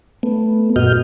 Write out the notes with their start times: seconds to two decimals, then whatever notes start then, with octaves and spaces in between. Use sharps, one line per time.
0.23 A3 B3
0.76 F#2 A#2 F#4 D#5 F6 G6